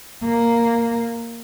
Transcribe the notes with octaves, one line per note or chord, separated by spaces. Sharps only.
A#3